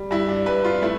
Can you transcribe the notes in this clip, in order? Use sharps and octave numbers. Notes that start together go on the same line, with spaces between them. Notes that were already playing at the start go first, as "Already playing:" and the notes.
Already playing: G3
G2 E4
D4
G2 B4
F4
A3 E4